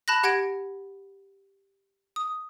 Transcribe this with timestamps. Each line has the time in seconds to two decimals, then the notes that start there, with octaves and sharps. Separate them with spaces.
0.08 A5 B5 F#6 A#6
0.23 G4 F#5 G#6 A#6 D7
2.16 D#6